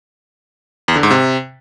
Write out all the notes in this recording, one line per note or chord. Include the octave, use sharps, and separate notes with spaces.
E2
D3
G#2
C3